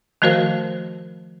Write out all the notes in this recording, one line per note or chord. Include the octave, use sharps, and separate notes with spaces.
D#3 F3 A3 F#4 A#4 C5